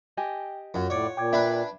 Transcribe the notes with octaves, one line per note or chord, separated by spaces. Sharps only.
G4 D#5 G5 G#5
F#2 F4 F#5
A2 C#5 D5
A#2 G5 D6 G#6
D4 B4 E5